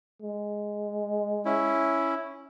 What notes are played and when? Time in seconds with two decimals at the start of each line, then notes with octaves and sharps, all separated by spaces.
0.22 G#3
1.45 C#4 E4